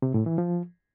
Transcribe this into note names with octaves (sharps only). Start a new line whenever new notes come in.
C3
A2
E3
F3